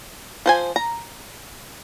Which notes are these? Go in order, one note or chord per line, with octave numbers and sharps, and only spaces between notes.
F3 C5 G#5
A#5